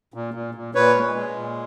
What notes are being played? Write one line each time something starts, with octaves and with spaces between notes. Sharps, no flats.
A#2
A#2
A#2
A#2 B4 C#5
G#3
G#3
A#2